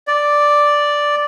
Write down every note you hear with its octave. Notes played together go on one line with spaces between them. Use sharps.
D5